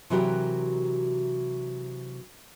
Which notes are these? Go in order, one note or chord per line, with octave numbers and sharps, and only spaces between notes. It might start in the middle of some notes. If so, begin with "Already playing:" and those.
C3 E3 F#3 F#4 G4 A#4